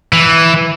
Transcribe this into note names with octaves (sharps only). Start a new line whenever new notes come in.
E3